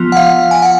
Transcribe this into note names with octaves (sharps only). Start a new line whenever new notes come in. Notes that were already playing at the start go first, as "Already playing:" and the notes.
Already playing: F3 B3 F4
F#5
F5
G#5
F#5